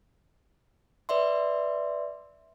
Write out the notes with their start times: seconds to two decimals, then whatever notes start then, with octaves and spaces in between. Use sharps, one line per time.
1.09 B4 D5 E5 C6